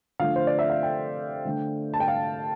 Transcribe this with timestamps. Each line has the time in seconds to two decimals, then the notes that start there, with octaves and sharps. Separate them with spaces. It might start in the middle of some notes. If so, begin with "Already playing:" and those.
0.19 D3 F3 A3 F5
0.36 C5
0.47 D5
0.59 E5
0.70 F5
0.83 G5
1.45 D3 A3
1.94 A5
2.00 G5
2.08 F5